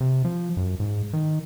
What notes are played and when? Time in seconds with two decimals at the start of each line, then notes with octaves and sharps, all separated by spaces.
0.01 C3
0.25 F3
0.57 F#2
0.80 G#2
1.13 D#3